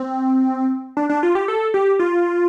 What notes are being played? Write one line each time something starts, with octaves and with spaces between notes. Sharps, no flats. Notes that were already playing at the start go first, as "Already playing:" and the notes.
Already playing: C4
D4
D4
F4
G4
A4
G4
F4